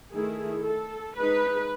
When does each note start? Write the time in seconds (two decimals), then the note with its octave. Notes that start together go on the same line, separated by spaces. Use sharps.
0.13 D#3 A3 E4 G#4
0.65 A4
1.16 G#3 D#4 B4